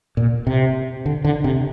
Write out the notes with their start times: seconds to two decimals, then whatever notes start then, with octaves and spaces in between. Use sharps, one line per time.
0.17 A#2
0.47 C3
1.06 D3
1.25 D3
1.44 C3